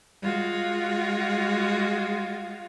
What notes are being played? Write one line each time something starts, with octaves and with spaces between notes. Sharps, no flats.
G#3 F4 F#4